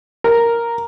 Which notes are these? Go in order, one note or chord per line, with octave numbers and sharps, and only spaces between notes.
A#4